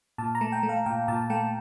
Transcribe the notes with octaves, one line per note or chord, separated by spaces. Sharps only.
A#2 A5
A#5
A3
G5
A3
F5
A#2 G5
A#2 A5
A3 G5